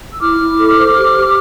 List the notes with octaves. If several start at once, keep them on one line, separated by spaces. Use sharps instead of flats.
E6
E4 D6 F6
E4
A4
C5
G4
G4